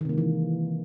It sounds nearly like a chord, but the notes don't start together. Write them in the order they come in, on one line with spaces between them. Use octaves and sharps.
D#3 C3 A#3 G#3 E3